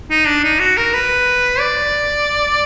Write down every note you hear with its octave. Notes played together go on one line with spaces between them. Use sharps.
D#4
D4
D#4
F#4
A#4
B4
D5